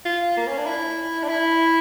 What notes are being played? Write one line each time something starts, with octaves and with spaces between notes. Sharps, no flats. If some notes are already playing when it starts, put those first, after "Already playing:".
F4
A#3
C#4
D4
E4
D4
E4